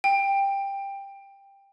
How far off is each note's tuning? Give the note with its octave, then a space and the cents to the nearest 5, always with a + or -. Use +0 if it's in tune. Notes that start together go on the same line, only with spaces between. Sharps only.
G5 +15